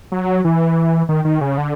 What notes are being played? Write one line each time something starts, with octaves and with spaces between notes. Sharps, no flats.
F#3
E3
D#3
D#3
C#3
D3